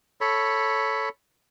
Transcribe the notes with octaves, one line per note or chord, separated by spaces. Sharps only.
A4 C#5 B5